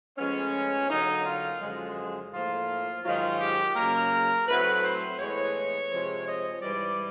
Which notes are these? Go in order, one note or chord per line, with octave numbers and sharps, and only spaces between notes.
A2 F3 G#3 B3 C#4
D3 F#3 A#3 D#4
F4
F#2 D3 F3 G#3
A2 F3 A#3 F4
G#2 D#3 F#3 F4
G4
C#3 F#3 A#3 A#4
A2 F#3 A3 C4 B4
C5
A2 E3 G#3 B3 C#5
C3 F3 G#3 C4
D#5
G#2 E3 G3 D5